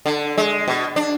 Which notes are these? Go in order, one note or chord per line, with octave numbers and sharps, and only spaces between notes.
D3
G#3
B2
D4